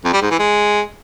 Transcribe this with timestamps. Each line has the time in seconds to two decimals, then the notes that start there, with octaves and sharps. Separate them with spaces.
0.04 F2
0.13 G3
0.22 G#2
0.31 E3
0.39 G#3